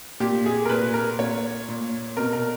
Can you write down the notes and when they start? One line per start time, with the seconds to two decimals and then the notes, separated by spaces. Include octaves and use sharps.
0.20 A#2 G4
0.46 G#4
0.65 A#4
0.69 A#2 B4
0.94 A#4
1.19 A#2 C#5
1.69 A#2
2.17 B2 A#4
2.33 A#4